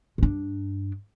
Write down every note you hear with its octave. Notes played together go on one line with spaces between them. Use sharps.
G2 D4